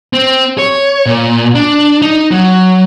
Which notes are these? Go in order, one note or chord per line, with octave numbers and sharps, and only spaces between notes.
C4
C#5
A#2
D4
D#4
F#3